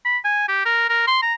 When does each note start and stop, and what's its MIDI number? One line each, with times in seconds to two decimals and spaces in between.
0.05 0.18 83
0.24 0.47 80
0.48 0.64 67
0.65 0.88 70
0.89 1.03 70
1.07 1.19 84
1.22 1.34 82